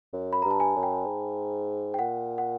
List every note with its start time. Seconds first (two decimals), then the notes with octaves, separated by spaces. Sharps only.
0.13 F#2
0.33 B5
0.42 G2 A#5
0.51 A5
0.60 G#5
0.76 F#2
0.83 G5
1.06 G#2
1.94 G5
1.99 A#2 F#5
2.38 F#5